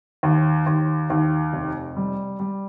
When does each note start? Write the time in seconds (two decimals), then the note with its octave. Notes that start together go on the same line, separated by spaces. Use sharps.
0.23 D#2
0.66 D#2
1.10 D#2
1.53 F1
1.97 G3
2.40 G3